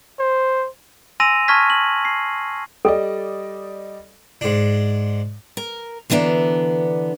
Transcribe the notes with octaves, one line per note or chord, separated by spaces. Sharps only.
C5
G#5 C6 E6 A#6 D#7 F7
A5 C#6 F6 G#6 B6
F#7
C7
G3 A4 D5 D#5
G#2 D4
A#4
D3 E3 B3 D4 A#5